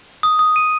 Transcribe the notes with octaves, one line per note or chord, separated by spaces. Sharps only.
D#6
D#6
D#7